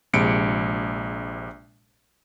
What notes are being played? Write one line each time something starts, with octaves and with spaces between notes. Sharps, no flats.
A#1 C3 G#3 C#7 D7